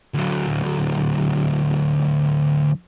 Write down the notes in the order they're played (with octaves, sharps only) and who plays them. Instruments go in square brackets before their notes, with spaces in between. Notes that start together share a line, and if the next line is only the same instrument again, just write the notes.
[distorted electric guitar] D2 F#3